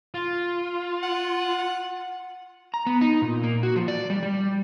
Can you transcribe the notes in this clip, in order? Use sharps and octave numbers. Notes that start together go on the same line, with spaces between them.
F4
F#5
A#5
B3
D#4
A#2
A#3
F#4
F3
D5
G3
G3